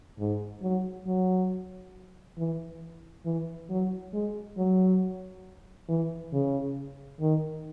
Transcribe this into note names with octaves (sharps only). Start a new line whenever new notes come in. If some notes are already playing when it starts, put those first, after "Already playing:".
G#2
F#3
F#3
E3
E3
F#3
G#3
F#3
E3
C#3
D#3